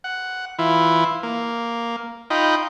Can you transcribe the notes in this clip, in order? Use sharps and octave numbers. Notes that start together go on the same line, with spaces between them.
F#5
E3 E4 F4
A#3
D#4 F4 D#5 G5 B5